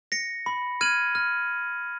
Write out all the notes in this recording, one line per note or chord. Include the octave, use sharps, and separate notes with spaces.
A#6 C#7
B5
F6 G#6 D#7 F#7
F6